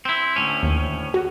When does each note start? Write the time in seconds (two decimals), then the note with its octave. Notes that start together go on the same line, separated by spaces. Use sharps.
0.05 C4 E4
0.36 D2 A2 C#4
0.63 D#2
1.14 F#4